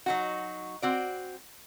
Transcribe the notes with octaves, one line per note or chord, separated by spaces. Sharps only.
F#3 D#4 F#4
C4 F#4 D5